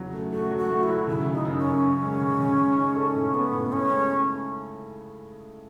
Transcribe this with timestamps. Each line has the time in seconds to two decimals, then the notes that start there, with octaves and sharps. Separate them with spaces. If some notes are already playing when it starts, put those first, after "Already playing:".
Already playing: E2 C#3 F#3
0.13 A3
0.32 A3 F#4
0.51 F#3
0.57 F#4
0.70 A3
0.83 E4
0.88 F#3
1.07 C#3 E4
1.26 C#3
1.33 D#4
1.45 F#2
1.58 C#4
1.64 F#2
1.83 F#2
2.02 G#3
2.21 C#3
2.40 C#3
2.59 G#3
2.77 D#4
2.96 A4
3.16 A2
3.34 B3 A4
3.53 A2
3.72 A2 C#4
3.91 G#3